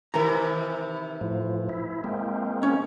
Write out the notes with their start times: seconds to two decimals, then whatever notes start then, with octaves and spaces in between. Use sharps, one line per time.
0.14 C3 D#3 E3 A#4 A#5
1.21 A2 F3
1.69 E4
2.04 G#3 A#3 C4
2.63 C#4